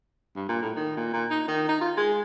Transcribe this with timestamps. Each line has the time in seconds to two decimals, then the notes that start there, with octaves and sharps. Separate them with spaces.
0.36 G2
0.49 A#2
0.62 A2
0.76 D#3
0.97 A#2
1.13 A#2
1.31 D#4
1.48 D#3
1.69 D#4
1.81 F4
1.97 G#3